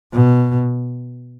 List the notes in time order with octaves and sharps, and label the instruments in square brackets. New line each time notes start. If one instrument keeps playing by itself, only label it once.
[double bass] B2